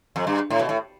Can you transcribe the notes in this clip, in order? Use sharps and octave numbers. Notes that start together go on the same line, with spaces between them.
F2
G2
A2
B2
A2